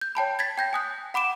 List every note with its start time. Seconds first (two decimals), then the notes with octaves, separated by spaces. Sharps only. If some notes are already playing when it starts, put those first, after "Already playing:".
0.01 G6
0.15 C#5 G5 A5 B5
0.39 G#6 A6 B6
0.58 G5 G6 A#6
0.73 G#5 D#6 F#6
1.14 F#5 B5 D6 D7 E7